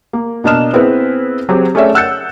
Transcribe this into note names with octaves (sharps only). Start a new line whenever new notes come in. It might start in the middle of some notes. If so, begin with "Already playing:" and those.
A#3
B2 A#3 D4 D#5 F6 E7
B3 C4 E4 G#4 B4
F#3 C4 G4 G#4
A3 C#4 G#4 C#5 D5 E5
F#5 E6 F#6 G6 A6 C#7